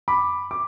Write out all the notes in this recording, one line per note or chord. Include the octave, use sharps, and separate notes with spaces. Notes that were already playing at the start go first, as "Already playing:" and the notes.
B5 D6
D6